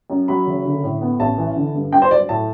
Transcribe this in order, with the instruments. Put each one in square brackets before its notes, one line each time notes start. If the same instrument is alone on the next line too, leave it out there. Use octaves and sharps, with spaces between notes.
[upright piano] F#2
F#3 B5
F#1
D3
A2
B3
A1 A5
E3
D3
G2
G2 G5
C5
F#3 D5
A2 A5